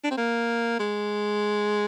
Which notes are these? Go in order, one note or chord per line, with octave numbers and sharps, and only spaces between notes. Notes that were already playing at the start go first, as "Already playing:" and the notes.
D4
C4
A#3
G#3